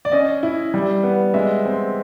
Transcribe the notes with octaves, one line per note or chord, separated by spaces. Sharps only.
D5
C#4 D#5
E4
G3
B3
G#3 E5
C4